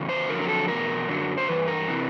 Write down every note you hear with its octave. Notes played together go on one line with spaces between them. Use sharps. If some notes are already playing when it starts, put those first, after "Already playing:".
Already playing: E2 C#3
C5
F2 D3 F#3 A#4
A#4
A4
E2 B2 G3 A#4
F#2 D3 F#3
C5
G2 E3 B4
A#4
C3 E3